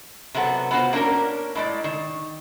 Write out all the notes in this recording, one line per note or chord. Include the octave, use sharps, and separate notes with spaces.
C3 F#3 B3 A4 F#5
B3 F4 F#4 C5
A#3 C#4 D4 A#4
A2 G#3 D5
D#3